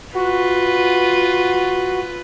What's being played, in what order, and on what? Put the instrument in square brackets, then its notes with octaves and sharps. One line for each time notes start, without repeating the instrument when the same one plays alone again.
[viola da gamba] F4 B4 [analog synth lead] F#4